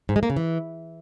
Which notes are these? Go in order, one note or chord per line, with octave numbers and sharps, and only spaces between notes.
G#2
G#3
A#3
C#3
E3